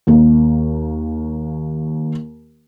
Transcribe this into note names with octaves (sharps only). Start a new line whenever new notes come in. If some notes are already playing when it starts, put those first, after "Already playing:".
D#2 A#3